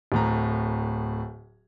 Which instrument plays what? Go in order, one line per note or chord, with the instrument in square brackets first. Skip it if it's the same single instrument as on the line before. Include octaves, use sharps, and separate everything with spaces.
[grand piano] D1 A2 A#5